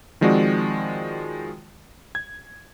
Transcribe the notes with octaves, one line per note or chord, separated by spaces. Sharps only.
D#3 F3 G#3 C4 F#4 D5
G#6